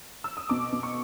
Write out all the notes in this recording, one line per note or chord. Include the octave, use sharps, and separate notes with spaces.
E6
D#6
B2 D6
B2
C#6